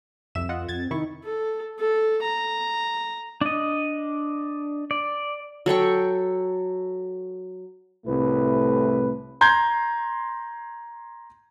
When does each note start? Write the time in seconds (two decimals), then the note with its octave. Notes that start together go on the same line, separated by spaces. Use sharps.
0.35 C2 F2 E5 E7
0.49 F4 D#5 F#5
0.69 F2 G#6 A6
0.91 C3 D#3 E4 C#6
1.24 A4
1.79 A4
2.22 A#5
3.41 D4 D#5
4.91 D5
5.66 F#3 A4 G5 C#6
8.06 C2 A2 C3 A3 B4
9.41 A#5 C6 G6 G#6